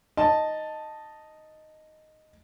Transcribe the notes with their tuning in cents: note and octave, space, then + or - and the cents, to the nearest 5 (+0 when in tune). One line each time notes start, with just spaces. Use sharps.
D#4 +0 A5 +5